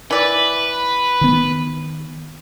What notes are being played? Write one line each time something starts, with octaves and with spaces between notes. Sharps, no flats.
E3 B4 D5
D#3 B3